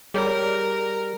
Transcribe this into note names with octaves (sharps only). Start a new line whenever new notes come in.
G3 G#4 A#4 C#5